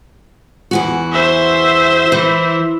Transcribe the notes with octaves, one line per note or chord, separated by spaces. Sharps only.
E2 E3 F#4
C5 E5
E3